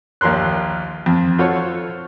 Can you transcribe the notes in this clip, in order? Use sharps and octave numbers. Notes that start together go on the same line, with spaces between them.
A#1 D#2 A#4 C6 F#6
F2
F4 F#4 A4 C5 C#5